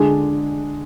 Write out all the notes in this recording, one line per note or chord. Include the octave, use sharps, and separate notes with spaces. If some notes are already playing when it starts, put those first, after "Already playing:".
Already playing: D3 G#3 D4 G#4 D5